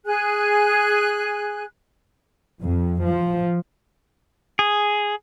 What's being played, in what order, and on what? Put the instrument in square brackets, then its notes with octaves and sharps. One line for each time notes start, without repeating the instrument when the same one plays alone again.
[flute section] G#4 G#5 F#6
[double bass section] F2
F3
[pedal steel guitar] G#4